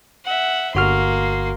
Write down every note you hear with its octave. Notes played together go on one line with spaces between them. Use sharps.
E5 F#5
G1 A#3 F#4 C6 F6